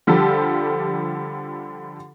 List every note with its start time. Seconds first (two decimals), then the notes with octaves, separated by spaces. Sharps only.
0.07 D3 F3 G3 G4 A4